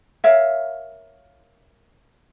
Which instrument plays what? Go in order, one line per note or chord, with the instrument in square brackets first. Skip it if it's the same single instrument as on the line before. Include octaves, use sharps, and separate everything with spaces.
[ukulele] A#4 C#5 E5 F5